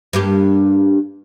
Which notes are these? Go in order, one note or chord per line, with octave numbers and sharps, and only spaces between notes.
G2 A#3 G4